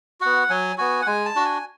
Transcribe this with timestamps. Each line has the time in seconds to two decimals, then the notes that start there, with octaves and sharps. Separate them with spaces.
0.21 B3 F#4 F#5
0.50 F#3 G#5
0.78 B3 F#4 G#5
1.02 F#5
1.07 G#3 G#5
1.26 A5
1.35 D4 F#4
1.45 G#5